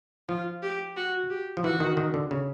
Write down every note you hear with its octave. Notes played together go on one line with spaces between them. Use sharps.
F3 F4
G4
F#4
G4
F3
E3 F#4
D#3
D#3
D3
C#3